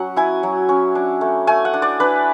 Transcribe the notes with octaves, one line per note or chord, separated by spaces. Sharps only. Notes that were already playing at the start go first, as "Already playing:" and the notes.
Already playing: F#3 C#4 F#5
E4 G#5
F#3
C#4
D4
A3
A3 G#5
F#5
D4
D5
D4 B4